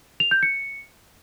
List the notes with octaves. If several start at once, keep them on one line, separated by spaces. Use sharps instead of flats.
F7
G6
C#7